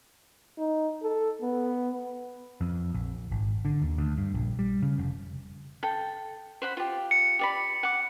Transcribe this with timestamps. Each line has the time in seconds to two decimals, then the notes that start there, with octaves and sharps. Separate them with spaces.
0.58 D#4
1.02 A4
1.42 B3
2.61 F2
2.94 A#1
3.31 G#1
3.65 D3
3.82 D#2
3.98 D2
4.18 G2
4.34 A#1
4.59 G3
4.83 C#3
4.98 F1
5.83 A4 G5
6.62 C5 F#5 B5
6.77 F4 G4
7.11 C#7
7.39 G4 D5 B5
7.83 F#5 D6